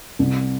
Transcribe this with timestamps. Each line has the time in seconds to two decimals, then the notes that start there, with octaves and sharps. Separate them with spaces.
0.19 C2